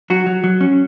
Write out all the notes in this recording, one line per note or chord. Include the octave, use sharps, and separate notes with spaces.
F#3 F#4
F#3
F#3
C#4